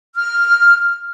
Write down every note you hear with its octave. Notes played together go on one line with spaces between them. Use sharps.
F6